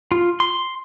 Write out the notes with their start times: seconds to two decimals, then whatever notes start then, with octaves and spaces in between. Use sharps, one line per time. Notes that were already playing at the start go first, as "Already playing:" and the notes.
0.12 F4
0.40 C6